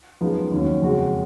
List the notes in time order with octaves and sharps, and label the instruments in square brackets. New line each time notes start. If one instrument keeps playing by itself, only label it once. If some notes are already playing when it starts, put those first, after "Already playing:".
[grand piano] F#2 F3 G#3 B3 D#4
D#2 D#3 F#3 C#4
F2 C#3 G#3 C#4 F#4